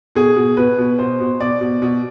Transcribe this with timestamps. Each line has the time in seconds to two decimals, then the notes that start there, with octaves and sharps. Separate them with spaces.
0.15 B2 G#4
0.36 B2
0.57 B2 B4
0.78 B2
0.99 B2 C5
1.20 B2
1.40 B2 D5
1.61 B2
1.82 B2